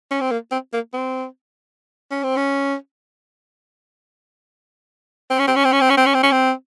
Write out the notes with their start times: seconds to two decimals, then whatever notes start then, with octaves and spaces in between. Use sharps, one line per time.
0.11 C#4
0.21 C4
0.31 A#3
0.51 C4
0.73 A#3
0.93 C4
2.11 C#4
2.23 C4
2.37 C#4
5.30 C4
5.39 C#4
5.47 C4
5.56 C#4
5.65 C4
5.72 C#4
5.81 C4
5.90 C#4
5.97 C4
6.06 C#4
6.14 C4
6.23 C#4
6.32 C4